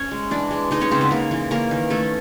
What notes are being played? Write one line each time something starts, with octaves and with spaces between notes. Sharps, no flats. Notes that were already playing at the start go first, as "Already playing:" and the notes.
Already playing: C#4 C#5
G#3
E3 D4 D5
G#3
G#3 D#4 D#5
C#4 C#5
C#3 C4 C5
B3 B4
C#3 A#3 A#4
E3
A#3 C#4 A#4
D#3
A3 C#4 A4